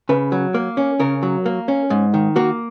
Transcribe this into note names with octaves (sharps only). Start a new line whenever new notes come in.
C#3 B4
F#3
A#3
C#4
C#3 A#4
F#3
A#3
C#4
G#2
D#3
A#3 F#4